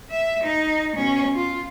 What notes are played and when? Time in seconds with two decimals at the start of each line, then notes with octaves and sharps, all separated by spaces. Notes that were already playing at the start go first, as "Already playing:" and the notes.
0.11 E5
0.44 D#4
0.96 B2 C#4
1.34 F4